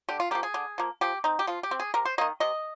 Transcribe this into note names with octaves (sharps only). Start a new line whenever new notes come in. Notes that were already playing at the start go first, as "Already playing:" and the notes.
D3 G4
F4
F3 A#3 G4
G#4
D3
F3 A#3
F3 G4
C4 D#4
G4
F3 F4
G4
C4
G#4
C3 A#4
C5
D#3 A#3 D#5
C3 D#5